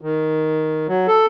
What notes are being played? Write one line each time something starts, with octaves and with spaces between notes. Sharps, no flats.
D#3
F#3
A4